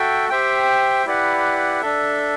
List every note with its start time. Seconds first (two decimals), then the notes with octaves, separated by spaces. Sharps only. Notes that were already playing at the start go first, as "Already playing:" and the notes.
Already playing: F#4 A4 E5 G5
0.30 G4 C5 E5 G5
1.06 E4 G4 B4 D5 F#5
1.81 D4 A4 E5